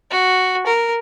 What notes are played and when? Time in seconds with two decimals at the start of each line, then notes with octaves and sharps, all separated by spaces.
0.11 F#4
0.66 A#4